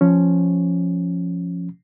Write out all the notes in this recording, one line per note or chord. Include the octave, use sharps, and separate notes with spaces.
F3 C#4